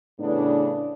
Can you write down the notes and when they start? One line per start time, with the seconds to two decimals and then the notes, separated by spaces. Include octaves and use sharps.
0.20 A2 C#3 E3 B3 D4